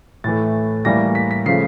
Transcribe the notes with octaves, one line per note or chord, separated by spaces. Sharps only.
A2 E3 A3 A6
A2 E3 G3 A#3 A#6
B6
B6
C#3 F3 A3 C7